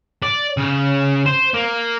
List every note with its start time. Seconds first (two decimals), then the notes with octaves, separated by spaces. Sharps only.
0.23 D5
0.57 C#3
1.26 C5
1.54 A#3